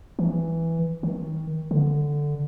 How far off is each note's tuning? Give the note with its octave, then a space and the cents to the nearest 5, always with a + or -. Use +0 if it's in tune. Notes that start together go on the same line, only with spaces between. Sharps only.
E3 +0
D#3 +30
D3 +0